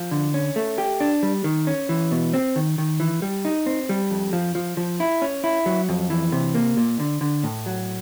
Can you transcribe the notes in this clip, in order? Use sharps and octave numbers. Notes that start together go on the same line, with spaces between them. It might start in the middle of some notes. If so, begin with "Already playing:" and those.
Already playing: F3
D3
C#4
A3
G4
D4
G3
D#3
C#4
E3
B2
C4
D#3
D#3
E3
G3
D#4
C4
G3
F2
F3
F3
F3
E4
C#4
E4
F#3
F2
E3
C3
A#3
A#2
D3
D3
A2
F#3